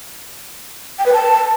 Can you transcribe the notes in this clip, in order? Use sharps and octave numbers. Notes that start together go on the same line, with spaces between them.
G5
B4
A5